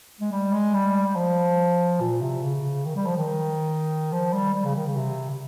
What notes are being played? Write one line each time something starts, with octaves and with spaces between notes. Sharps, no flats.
G#3
G3
G#3
G3
G3
F3
A#2
C3
C#3
D#3
G3
F3
D#3
F3
G3
G3
C#3
D#3
C#3
C3
C3